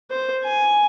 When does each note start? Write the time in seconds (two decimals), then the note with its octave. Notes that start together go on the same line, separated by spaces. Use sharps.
0.11 C5
0.44 G#5